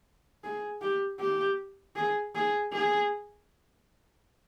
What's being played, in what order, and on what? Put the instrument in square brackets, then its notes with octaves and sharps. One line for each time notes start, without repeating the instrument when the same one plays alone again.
[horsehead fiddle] G#4
G4
G4
G#4
G#4
G#4